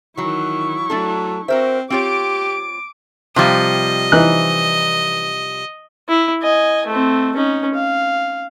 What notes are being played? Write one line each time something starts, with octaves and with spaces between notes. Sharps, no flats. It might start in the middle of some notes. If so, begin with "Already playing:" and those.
D#3 E3 F#3 E4 C#6
F#3 A3 D4 A4
C4 F#4 A#4 C5 E5
C4 F4 G4 C#5 D6 D7
C3 F3 G3 D#5
E3 D#4 F#6
E4
D#5 G#5
A3 C4
C#4 D#4
F5